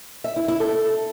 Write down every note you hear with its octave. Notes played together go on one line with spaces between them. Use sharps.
E5
E4
E4
A4